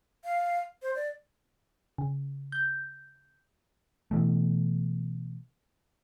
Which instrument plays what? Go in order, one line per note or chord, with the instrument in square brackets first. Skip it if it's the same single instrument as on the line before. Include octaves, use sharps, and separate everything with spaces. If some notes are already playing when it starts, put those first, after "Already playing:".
[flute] F5
C5
D5
[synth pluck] C#3
G6
[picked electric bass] B2 E3 A3